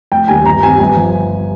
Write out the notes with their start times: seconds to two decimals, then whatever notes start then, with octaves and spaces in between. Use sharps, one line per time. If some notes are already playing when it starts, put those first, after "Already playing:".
0.11 F1 G5
0.28 D#2 D#3 G3 G#5
0.45 G1 A#5
0.63 F2 D#3 G3 G#5
0.80 G1 G#5
0.97 F3